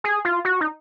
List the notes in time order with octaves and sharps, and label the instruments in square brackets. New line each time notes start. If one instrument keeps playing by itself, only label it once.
[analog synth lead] G#4
F4
F#4
D#4